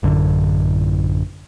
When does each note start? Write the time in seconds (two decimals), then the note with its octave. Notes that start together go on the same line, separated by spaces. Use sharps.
0.03 A1 F#2 D3